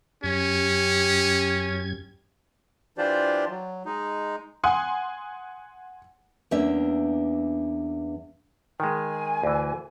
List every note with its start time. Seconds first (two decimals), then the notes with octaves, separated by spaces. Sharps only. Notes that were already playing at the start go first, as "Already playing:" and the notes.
0.23 F#2 C#4 G4 G#6
2.98 E3 D4 F4 G4 C5 D5
3.49 F#3
3.85 G#3 D#4
4.64 F#5 G#5 C6 D#6
6.51 E2 A#3 C#4 D4 E5
8.80 D#3 G#3 G#5
9.43 D2 E3